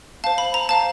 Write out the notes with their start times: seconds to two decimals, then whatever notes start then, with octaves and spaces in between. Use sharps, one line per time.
0.24 F5 A5
0.27 C5
0.38 B5
0.54 A#5
0.69 C5 F5 A5